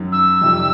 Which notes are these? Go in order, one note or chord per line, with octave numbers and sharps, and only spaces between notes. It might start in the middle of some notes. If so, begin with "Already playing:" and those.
Already playing: F#2 D#3 F#3
E6
F2 C3 D#3 G3